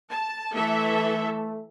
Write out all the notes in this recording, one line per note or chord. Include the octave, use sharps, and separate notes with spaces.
A5
E3 A3 A4 E5